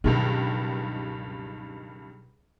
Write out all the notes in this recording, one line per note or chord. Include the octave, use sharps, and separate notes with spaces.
C#2 G2 B2 D#3 F#3